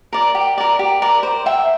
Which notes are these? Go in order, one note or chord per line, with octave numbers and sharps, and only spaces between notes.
A#4 D5
G4
A#4 D5
G4
A#4 D5
C5
E5 G5